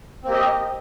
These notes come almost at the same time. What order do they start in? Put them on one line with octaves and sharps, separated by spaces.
C4 A#3 G4 D#5